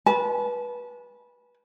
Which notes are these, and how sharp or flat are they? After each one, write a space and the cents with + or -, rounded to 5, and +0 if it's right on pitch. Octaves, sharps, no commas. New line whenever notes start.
B4 -20 A5 -30